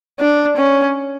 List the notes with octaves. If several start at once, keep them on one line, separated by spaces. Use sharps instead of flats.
D4
C#4